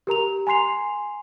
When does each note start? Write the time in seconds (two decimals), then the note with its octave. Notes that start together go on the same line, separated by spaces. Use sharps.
0.07 G4 A#4 A#5 F7
0.47 G#5 A#5 C6 C7 F7